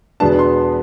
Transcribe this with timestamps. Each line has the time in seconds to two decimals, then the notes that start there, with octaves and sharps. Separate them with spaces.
0.20 E2 B2 G#3 B3 D4 A5
0.39 C6